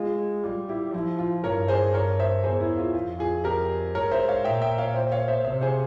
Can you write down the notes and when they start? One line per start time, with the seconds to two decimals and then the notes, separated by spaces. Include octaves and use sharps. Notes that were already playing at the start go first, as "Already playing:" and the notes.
Already playing: G#3 F4
0.44 G3 F4
0.69 E4 G4
0.93 F3 E4
1.19 F4
1.43 G2 A#4 C#5
1.68 G#4 C5
1.94 A#4 C#5
2.19 C5 E5
2.44 E2 G#4 C5
2.60 E4
2.78 F4
2.95 F2 F4
3.19 F4 G#4
3.44 G4 A#4
3.95 G#2 A#4 C#5
4.11 C5 E5
4.28 C#5 F5
4.44 A#2 E5 G5
4.62 E5 G5
4.78 C#5 F5
4.95 C5 E5
5.12 C#5 F5
5.28 C5 E5
5.45 C3 C5 E5
5.61 G#4 C5